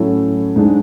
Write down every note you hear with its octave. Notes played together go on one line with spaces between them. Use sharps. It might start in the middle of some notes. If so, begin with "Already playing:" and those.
Already playing: A2 F#3 C#4 E4 A4
G#2 G#3 D4